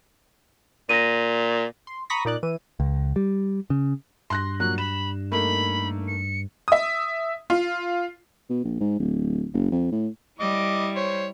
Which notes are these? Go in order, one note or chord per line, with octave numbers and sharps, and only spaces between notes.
A#2 A#6 D#7
C6
A#5 B5 C#6 D#6 A#6 B6
A#2 D#4 D5 F#6
E3 D#7
C#2
G3
C#3
G2 C6 F#6 A#6
A#2 F#3 F#6
B5 E7
A3 A#3 D#4 B5
C#7
E5 D#6
F4
B2
A#1
G#2
D1
F#1
F2
A2
G3 E4 D#5 D6
C5 C#5